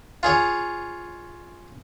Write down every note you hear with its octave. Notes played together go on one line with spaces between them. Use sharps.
F4 G#4 C#5